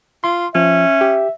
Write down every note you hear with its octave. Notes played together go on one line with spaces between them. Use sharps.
F4 C6
F3 C#4 E5
G4